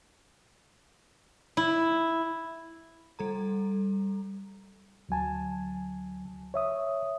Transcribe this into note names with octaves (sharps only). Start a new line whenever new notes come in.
E4
G3 A4 A#5
D2 F#3 G#5 A5
C#5 E5 D#6